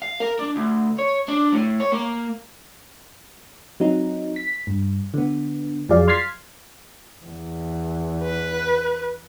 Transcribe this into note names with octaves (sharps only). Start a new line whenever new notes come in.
F5
A#4
D4
D2
C#5
D4
A2
C#5
A#3
F#3 C4 D#4
B6
G2
D3 B3
F2 F3 F#3 G#4 D5 F5
C6 F6 G#6 A6 B6 C7
E2
B4